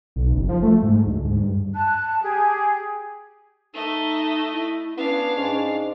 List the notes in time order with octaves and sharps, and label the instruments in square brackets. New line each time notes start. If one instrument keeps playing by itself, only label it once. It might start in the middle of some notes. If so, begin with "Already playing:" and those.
[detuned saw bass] B1
F#1
F3
A3
G#2
D2
G#2
G2
[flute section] A5 F#6
G4 G#4
[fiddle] A3 D#5 [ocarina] D#4
[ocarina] E4
[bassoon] B3 [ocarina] C#4 [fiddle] D4 F5
[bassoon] G#2